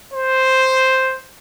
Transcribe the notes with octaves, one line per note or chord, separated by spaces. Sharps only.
C5